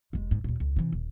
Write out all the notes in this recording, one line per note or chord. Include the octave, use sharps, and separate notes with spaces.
F1 G#3
G#2
D#2 A#2
C#2
C3 E3
D#1